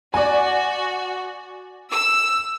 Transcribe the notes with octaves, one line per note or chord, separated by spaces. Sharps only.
F#4 D5 G#5
E6